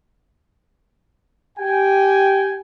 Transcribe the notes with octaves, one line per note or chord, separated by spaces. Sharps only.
G4 G5 G#5